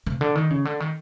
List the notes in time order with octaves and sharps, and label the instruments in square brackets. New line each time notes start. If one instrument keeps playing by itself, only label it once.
[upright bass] C3
D3
D#3
C#3
D3
D#3